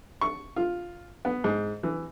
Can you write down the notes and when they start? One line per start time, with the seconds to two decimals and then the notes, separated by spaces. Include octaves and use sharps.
0.21 C#6
0.56 F4
1.25 B3
1.44 G#2
1.83 E3